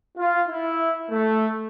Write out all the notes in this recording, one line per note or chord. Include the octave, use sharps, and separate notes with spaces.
F4
E4
A3